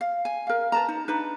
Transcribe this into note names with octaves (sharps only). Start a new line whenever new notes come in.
F5
G#5
A#4 F5
B4 A5 A#5
D#4
D4 D#4 B4